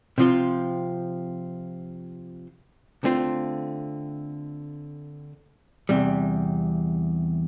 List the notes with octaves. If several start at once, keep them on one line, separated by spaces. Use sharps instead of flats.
C3 F3 C4 F4
D3 A3 C4 F4
E2 C3 G3